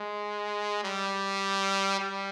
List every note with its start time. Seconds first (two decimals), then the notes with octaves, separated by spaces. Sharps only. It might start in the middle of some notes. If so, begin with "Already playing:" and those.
Already playing: G#3
0.84 G3
2.00 G3